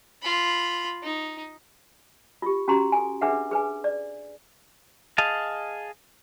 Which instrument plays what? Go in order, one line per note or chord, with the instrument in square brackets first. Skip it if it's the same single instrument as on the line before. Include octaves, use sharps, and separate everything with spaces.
[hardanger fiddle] F4 B5
D#4
[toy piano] F4 G4
C#4 F#4 G4 A#5 C6
A4 G#5
D4 G#4 B4 E5 F#5
G#4 B4 G#5
D5
[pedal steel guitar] G#4 D#5 F5 A5